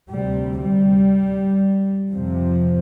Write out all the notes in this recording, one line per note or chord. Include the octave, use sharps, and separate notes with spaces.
D2 C3 G3
G3
F2 C3 F3